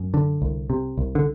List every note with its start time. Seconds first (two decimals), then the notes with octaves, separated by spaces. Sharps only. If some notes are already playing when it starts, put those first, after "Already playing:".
Already playing: F#2
0.14 D3
0.42 C2
0.70 C3
0.98 C2
1.15 D3